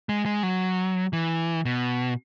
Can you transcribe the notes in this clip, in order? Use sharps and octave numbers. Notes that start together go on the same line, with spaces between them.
G#3
G#3
F#3
E3
B2